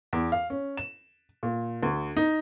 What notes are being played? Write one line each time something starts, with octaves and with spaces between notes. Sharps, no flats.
E2
F5
C#4
E7
A#2
D2
D#4